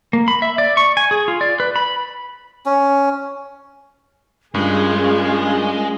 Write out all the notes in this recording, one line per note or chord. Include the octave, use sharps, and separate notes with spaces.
A#3
B5
E5
D5
C#6
G#5
G#4
F4
D5
B4
B5
C#4
G2 G#3 C#4 F4 G#4 A#4